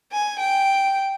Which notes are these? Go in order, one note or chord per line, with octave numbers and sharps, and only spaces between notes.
G#5
G5